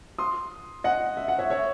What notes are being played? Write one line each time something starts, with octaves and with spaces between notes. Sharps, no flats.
C6 D#6
D#5 F#5
E5
F#5
C#5 E5
C#5 E5